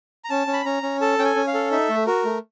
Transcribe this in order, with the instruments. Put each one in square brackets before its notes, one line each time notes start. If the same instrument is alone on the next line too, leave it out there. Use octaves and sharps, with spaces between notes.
[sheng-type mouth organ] A#5
C#4 A5
C#4
B5
C#4 A#5
C#4
A4 A5
C#4 G5
G#5
C#4
F5
A4
D#4 E5
A3
F#4 A#4
A3